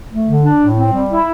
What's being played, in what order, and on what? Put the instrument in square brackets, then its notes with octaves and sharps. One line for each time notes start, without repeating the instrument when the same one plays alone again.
[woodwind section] A3
D3
D4
A2
C4
G3
E4